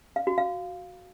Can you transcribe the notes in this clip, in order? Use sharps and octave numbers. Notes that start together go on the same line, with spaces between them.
F5
F#4
F5